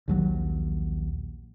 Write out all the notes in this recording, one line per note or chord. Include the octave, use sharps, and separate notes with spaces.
A#1 D#2 F#3